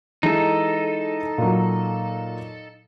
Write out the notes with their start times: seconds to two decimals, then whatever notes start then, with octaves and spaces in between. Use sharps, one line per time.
0.23 E3 G#3 D#4 A4
1.38 A#2 F#3